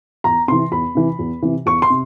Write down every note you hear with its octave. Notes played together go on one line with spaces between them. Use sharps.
E2 A#5
C3 E3 C6
E2 B5
C3 E3
E2
C3 E3
E2 C#6
C6
C3